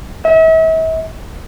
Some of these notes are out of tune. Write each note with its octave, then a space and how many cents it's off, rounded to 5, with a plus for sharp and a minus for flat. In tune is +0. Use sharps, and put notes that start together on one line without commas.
E5 -40